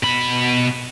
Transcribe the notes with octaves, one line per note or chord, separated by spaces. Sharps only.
B2 B5